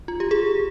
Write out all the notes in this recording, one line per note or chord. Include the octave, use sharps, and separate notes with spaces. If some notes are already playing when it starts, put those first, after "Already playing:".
F4
G4
G#4